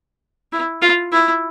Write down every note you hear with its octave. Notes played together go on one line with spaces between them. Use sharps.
E4
F4
E4